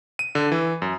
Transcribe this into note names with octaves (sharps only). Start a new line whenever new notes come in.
D#7
D3
E3
F#2